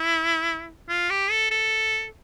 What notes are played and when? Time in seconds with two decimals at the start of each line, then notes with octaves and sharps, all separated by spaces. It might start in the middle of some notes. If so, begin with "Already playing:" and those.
Already playing: E4
0.89 F4
1.10 G4
1.30 A4
1.51 A4